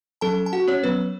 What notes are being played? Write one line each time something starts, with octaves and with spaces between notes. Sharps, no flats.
F#3 C#4 A4 A5
A5
F#4 F#5
C#4 C#5
F#3 B3 B4